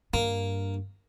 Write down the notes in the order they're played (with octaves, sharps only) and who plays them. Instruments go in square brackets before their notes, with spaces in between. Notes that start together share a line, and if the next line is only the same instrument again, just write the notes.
[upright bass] G2 [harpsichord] A#3